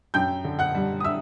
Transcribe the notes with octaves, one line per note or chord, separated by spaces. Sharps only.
F#2 G5 G6
D3
F#5 F#6
G3
D#6
E5 E6